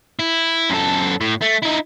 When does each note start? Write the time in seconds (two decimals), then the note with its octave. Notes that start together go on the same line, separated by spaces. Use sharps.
0.19 E4
0.70 F#2 A4
1.21 A2
1.41 A3
1.62 D#4 E4